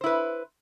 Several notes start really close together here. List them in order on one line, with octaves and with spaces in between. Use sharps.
C5 E4 B4